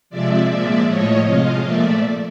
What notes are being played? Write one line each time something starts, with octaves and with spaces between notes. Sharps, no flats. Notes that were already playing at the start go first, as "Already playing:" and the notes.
C3 F3 G#3 D5 E5
A#2 F3 G#3 D5 E5
A2 F3 A3 C#5 D#5
C3 F3 G#3 D#5 F5
A#2 F3 A3 D5 E5